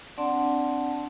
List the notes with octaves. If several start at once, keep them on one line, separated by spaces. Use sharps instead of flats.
C4 D4 D5 F#5 A5 C6